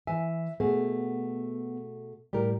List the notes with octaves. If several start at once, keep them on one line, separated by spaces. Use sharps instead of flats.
E3 E5 G#5
B2 A3 B3 G#4
A2 G3 G4 A#4